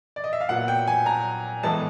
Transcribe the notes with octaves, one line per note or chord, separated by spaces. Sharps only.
D5
D#5
E5
F5
A#2 F#3 B3 F#5
G5
G#5
A#5
A2 E3 G#3 B3 A5